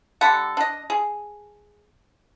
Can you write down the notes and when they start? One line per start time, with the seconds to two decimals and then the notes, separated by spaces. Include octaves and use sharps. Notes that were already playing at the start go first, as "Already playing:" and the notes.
0.21 D3 G3 A4 F#5
0.57 D4 D#5
0.90 G#4